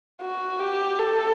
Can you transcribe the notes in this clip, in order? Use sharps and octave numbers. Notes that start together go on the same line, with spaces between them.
F#4
G4
A4